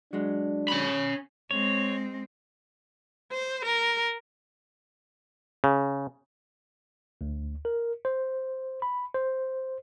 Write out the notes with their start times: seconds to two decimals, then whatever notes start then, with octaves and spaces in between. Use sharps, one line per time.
0.13 F#3 G#3 D4
0.68 C#4 B5
1.51 G#3 C4 C#5
3.32 C5
3.65 A#4
5.64 C#3
7.21 D2
7.65 A#4
8.05 C5
8.82 B5
9.14 C5